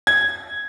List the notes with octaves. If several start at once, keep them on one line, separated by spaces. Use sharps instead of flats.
G#6